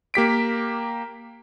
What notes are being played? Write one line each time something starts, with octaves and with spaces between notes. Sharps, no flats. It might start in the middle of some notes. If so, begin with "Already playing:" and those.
A#3 G4 B6 D7